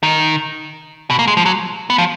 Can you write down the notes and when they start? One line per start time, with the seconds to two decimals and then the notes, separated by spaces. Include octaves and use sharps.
0.03 D#3
1.10 B2
1.19 A#3
1.27 G#3
1.37 F3
1.46 F#3
1.90 B3
1.98 F3